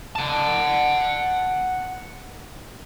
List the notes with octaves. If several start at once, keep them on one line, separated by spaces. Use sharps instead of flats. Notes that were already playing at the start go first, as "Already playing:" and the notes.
F#5 A5